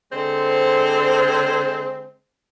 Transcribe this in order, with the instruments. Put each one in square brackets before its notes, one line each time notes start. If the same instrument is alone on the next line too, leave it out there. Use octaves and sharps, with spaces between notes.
[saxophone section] D3 G#3 C4 C5